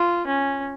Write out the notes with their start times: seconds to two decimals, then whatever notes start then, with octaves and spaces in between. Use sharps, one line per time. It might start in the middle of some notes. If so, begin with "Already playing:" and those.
Already playing: F4
0.27 C#4